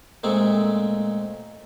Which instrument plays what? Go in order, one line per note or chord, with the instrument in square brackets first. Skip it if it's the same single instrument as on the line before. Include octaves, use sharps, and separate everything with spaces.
[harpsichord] A#2 G#3 A3 C4